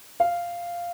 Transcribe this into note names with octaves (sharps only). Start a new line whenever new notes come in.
F5